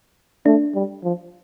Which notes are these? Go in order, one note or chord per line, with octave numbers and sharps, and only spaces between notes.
A3 D4
G3
F3